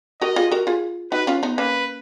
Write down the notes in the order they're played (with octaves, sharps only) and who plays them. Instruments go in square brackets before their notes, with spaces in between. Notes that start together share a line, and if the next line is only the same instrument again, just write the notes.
[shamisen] F#4 A#4 [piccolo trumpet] D#5
[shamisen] F4 G#4
F#4 A#4
F4 G#4
[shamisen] D#4 F#4 [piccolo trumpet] B4
[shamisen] C#4 F4
B3 D#4
[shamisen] A#3 C#4 [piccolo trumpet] B4